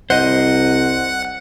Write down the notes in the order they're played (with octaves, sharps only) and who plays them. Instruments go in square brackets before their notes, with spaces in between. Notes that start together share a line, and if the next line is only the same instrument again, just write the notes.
[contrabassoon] C2 [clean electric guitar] C5 D#5 [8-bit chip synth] F#5